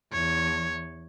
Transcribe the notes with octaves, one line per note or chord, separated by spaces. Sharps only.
E2 C#5